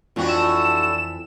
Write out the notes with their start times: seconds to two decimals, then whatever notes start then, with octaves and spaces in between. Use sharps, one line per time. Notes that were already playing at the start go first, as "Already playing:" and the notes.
0.16 F2 A2 E3 D4 F4 F#4
0.28 A4 E7